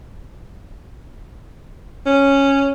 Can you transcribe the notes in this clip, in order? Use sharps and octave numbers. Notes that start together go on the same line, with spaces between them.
C#4